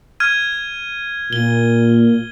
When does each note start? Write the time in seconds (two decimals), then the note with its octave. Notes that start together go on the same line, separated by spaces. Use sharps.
0.20 F6 G#6 D#7
1.33 A#2 G7